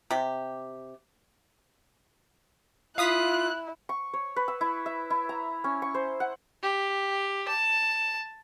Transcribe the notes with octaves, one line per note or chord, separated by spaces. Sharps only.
C3 G4
E4 F4 F5 D#6 F#6 B6
C#6
C#5
B4
E6
E4
E5
E4
A#5
C#4
C#6
C5
F#5
G4
A5